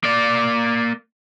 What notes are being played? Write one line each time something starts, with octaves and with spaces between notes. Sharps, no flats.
A#3 D5